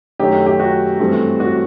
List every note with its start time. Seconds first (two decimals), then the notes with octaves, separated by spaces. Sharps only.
0.19 F#2 D#3 A3 D#4 G4
0.46 G4
0.59 F#4
1.00 G2 E3 A3 C4
1.40 F#4